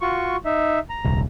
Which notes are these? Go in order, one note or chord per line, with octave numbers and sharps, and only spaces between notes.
F4 F#4 C#6
D#4 E5
A#5
D#1 C2